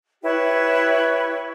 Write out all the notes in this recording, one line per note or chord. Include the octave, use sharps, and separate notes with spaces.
E4 G4 B4 C#5